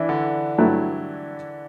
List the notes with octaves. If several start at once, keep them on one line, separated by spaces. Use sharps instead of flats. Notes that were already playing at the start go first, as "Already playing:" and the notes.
Already playing: E3 D4 E4
D3
G2 F#3 A3 E4